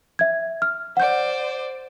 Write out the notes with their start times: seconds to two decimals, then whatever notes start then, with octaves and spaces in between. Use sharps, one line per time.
0.19 E5 G#6
0.62 F6
0.97 C5 D5 F#5 G6